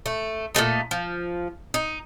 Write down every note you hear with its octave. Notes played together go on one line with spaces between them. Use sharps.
A3
A#2 C#3 A3 D#4
F3
D#4